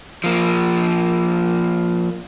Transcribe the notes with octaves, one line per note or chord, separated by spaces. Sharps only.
F3 A#3